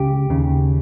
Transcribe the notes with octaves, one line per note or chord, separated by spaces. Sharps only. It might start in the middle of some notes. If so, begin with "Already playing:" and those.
Already playing: C#2 C#3 G4
D#2 C#3